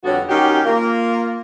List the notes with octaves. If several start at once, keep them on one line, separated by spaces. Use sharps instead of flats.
F2 D3 G3 B3 F#4 C#5
D#3 F#3 C#4 G4
A#3 F4